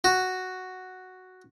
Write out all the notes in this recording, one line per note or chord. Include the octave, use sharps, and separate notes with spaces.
F#4